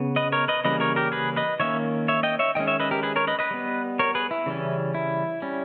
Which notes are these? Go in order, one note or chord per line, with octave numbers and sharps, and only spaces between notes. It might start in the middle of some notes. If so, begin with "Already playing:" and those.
Already playing: C#3 B3
B4 D#5
A#4 C#5
B4 D#5
C#3 E3 G3 A#3 C#4 B4 D#5
A#4 C#5
G4 A#4
G#4 B4
B4 D#5
D#3 A#3 C#4 C#5 E5
C#5 E5
D#5 G5
C#5 E5
D#3 G#3 C#4 D#5 G5
C#5 E5
B4 D#5
G4 A#4
G#4 B4
A#4 C#5
B4 D#5
B4 D#5
G3 B3
A#4 C#5
G#4 B4
E4
C#3 E3 G3 C#4
E4
G3 C#4